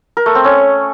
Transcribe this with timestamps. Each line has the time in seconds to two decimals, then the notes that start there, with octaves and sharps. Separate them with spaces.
0.17 A#4
0.26 A3
0.35 C4
0.44 C#4